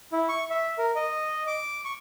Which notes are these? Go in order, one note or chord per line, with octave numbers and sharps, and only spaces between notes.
E4
C#6
E5
A#4
D#5
D6
C#6